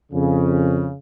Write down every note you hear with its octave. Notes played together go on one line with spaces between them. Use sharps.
F2 C#3